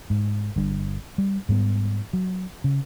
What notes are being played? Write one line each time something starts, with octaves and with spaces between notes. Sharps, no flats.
G#2
G1 G2
G3
G#2 G3 B3
F#3
C#3